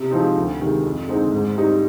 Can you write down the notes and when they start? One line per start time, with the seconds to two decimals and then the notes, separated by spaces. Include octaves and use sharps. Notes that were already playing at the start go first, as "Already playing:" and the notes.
Already playing: C3
0.11 F3 G#3 C4 D#4
0.36 D2
0.59 C3 D#3 G#3
0.83 F2
1.08 D3 G#3 C4 D#4
1.32 G#2
1.56 G3 C4 D#4